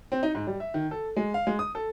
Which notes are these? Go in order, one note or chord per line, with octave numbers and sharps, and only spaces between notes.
C4
D#4
G#2
G3
E5
D#3
A4
G#3
F5
G#3
D#6
A4